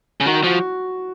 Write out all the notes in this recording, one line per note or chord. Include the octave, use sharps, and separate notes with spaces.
C#3
D#3 F#4
F3 F#4